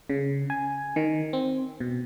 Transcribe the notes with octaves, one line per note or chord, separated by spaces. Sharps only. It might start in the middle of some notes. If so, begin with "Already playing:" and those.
C#3
G#5
D#3
C4
B2